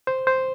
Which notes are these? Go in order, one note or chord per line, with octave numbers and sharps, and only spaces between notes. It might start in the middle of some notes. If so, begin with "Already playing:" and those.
C5
C5